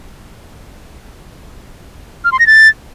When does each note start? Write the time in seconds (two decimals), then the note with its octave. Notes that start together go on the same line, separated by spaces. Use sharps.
2.25 F6
2.32 C6
2.39 A#6
2.47 A6